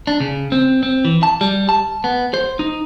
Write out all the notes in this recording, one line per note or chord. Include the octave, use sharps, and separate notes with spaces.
D4
C#3
C4
C4
E3
A5
G3
A5
B3
C5
D#4